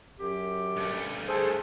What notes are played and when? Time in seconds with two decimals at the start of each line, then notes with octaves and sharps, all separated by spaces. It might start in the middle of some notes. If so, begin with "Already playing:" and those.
0.19 F#2 G4
0.76 G2 A3
1.28 G#4 A4 C5